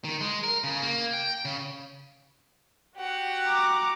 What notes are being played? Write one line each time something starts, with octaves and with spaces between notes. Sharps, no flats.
D#3
G#3
A#4
C#3
A#3
G5
C#3
F#4 G4 F#5
A#5 D6